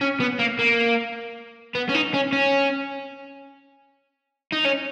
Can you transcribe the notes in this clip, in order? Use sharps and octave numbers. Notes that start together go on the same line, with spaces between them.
C#4
B3
A#3
A#3
B3
C#4
D#4
C#4
C#4
D#4
C#4